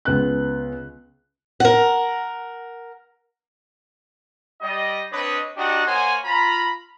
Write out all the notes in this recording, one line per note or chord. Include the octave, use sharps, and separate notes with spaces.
C#2 B3 F#6
A#4 F#5
G3 D#5
C4 D4 B4 C#5 D#5
D4 D#4 F#4 G4 D#5 F#5
A#3 C5 C#5 F#5 G#5
F4 A#5 B5